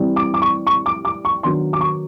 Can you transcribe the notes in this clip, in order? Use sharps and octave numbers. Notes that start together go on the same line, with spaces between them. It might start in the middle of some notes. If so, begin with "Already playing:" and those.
Already playing: E3 G3 C4
D6
D6
C#6
C#6
D6
D6
C#6
D#3 F#3 B3 D4 C6
D6
C#6